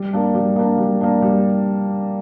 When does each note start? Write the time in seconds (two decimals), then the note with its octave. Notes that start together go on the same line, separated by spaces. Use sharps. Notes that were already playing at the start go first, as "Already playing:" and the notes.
Already playing: G3
0.13 A#3 D4
0.35 G3
0.56 A#3 D4
0.78 G3
1.01 A#3 D4
1.22 G3